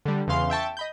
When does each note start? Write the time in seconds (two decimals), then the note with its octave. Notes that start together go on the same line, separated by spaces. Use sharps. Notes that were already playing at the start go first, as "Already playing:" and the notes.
0.05 D3 G3
0.27 E2 C#3 E3 F5 C6
0.50 E5 G5 A5 C#6
0.77 D#5 B5 G6